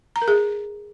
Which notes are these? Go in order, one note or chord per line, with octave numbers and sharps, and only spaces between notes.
A#5
A#4
G#4